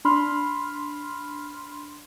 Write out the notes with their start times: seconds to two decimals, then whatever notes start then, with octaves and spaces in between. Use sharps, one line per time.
0.05 D4 B5 C6 F6